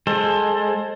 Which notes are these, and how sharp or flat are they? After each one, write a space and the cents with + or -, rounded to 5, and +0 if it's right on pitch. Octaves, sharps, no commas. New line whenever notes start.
G#3 +0 A4 +10 C5 +25